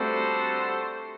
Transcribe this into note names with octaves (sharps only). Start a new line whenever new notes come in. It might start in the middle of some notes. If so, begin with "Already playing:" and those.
Already playing: G3 A3 C4 D4 F#4 A4 C5